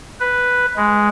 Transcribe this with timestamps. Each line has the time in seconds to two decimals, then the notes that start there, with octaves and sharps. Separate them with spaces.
0.20 B4
0.76 G#3